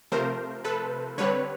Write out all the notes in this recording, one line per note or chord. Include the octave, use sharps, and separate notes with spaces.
C3 F3 A3 A#4 C5
A4 B4
D3 G3 C4 B4 C#5